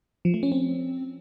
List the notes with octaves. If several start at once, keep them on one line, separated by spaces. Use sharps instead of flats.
F3
A3
C#4
C4